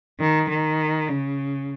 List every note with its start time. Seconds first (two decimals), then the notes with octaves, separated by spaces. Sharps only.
0.20 D#3
0.49 D#3
1.08 C#3